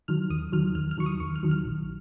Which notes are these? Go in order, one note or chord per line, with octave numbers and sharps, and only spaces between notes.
D#3 F#3 F6
D#2 D#6
D#3 F#3 F6
D#2 F6
F6
D#3 F#3 C#6
D#6
D#2 C#6
F6
D#3 F#3
F6
A#1